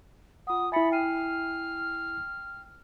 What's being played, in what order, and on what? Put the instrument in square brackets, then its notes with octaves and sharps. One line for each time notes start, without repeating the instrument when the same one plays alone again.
[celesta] F4 F#5 [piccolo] D#6
[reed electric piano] E4 G#5 [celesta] E5 A6 C#7 [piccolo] B5
[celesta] G5 C7 D#7 [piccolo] F6